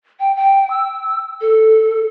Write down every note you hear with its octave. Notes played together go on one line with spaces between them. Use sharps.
G5
G5
E6
A4